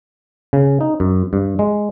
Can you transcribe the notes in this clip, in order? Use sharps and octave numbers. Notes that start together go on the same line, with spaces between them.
C#3
D#4
F#2
G2
G#3